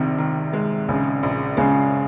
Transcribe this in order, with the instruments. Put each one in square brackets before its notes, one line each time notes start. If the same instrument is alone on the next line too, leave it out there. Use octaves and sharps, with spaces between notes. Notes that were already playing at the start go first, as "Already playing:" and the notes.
Already playing: [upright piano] A#1 D#3 [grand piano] C3
[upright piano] D#3
G#3
[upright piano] A#1 [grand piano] C#3
[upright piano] A#1
[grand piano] C#3 [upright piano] G#3